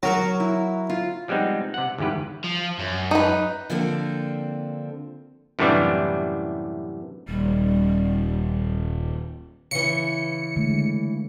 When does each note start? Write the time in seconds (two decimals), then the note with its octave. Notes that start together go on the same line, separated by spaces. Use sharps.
0.03 F#3 F#4 A#4 C#6
0.40 E4
0.90 F4
1.28 F3 G3 G#3 B3 C4 D#4
1.74 C3 F#5
1.98 G1 E2 G#2 G4 B4
2.44 F3
2.79 F#2
3.11 D#4 B4
3.70 D3 F3 A#3 C4 D4 A4
5.59 F#2 A2 C3 E3 G3 D4
7.29 D#1 G3
9.71 C#3 E3 C#7
10.56 D3 G#3 A3